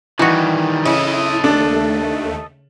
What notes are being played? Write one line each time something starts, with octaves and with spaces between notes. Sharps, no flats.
D#3 E3 G3 D#4 F#4
C#3 E4 A4 D#5
D#2 A3 D4